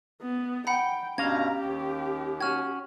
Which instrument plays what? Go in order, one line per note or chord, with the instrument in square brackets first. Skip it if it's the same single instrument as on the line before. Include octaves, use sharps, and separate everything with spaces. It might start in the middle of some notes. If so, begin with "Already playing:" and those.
[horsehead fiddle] B3
[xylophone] F#5 A#5 B5 [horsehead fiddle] G5
[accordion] G2 B2 A#5 [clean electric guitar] C#4 F5 [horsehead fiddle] G4 [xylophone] G#6
[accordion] D#2
[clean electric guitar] C#4 F#4 [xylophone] F6 G#6